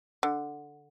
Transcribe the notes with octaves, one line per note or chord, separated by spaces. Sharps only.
D3